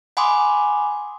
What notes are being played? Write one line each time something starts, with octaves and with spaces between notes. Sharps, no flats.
F#5 G#5 B5 C6 D6 D#6